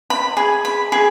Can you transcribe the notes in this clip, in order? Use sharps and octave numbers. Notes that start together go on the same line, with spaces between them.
B5
G#4
B5
G#4